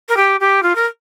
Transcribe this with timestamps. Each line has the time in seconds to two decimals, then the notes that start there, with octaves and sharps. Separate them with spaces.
0.09 A#4
0.17 G4
0.40 G4
0.63 F4
0.75 A#4